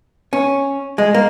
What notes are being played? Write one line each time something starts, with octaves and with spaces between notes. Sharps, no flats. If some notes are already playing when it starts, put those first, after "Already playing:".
C#4
G#3
A#3